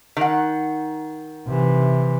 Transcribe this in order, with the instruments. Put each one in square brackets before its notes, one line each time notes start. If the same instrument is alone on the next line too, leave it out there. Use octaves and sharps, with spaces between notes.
[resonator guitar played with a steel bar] D#3 F#5
[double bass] C3 E3